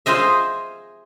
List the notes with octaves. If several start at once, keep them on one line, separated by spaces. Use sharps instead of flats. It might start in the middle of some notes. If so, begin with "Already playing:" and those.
F4 G#4 C5 D#5 E5